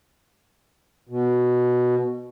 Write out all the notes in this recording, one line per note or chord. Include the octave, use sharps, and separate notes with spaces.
B2